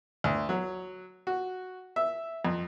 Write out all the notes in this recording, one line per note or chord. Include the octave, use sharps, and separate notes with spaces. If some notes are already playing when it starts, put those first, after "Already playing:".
D2
F#3
F#4
E5
F2